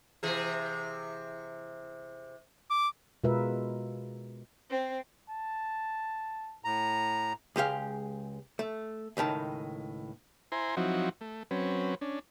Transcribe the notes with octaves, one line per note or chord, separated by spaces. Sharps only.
C3 E3 G#4
D6
B2 G#3 F4 A#4 B4 E5
C4
A5
A2 A#5
C#2 G#3 G4 F5
A3
C#2 A2 D#3 A5
E4 C5 G#5 A#5 C6
F3 F#3 C4 D#4 E4 F#4
A3
F#3 C4 C#4 B4
C#4 D4